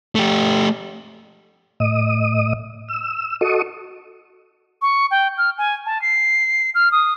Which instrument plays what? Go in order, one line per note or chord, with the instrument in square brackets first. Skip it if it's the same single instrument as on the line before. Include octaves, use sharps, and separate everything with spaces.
[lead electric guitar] A3 G4
[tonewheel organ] A2 D#5 D#6
E6
F#4 A4 D#5 C#6 D#6
[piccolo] C#6
G5
F6
G#5
A5
C7
F6
D#6